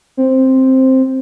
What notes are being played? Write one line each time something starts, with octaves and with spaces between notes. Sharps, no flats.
C4